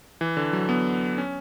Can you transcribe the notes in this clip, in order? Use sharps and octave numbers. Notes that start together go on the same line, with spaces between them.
E3
D3
F#3
B3
C#4